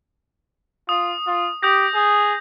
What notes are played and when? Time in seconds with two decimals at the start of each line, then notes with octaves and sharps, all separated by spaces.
0.89 F4 D#6
1.27 F4
1.63 G4 D#6 G6 A#6
1.94 G#4